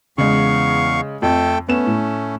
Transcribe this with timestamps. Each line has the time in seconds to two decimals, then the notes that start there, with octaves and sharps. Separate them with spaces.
0.18 E2 C#3 G#3 F5 C#6
1.22 F2 A3 A4 G5
1.69 A3 B3 C#4 E7
1.86 A2